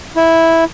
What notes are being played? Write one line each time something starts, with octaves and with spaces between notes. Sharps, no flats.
E4